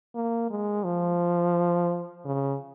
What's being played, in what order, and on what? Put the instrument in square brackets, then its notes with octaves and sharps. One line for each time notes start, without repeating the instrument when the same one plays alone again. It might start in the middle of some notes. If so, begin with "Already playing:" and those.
[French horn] A#3
G#3
F3
C#3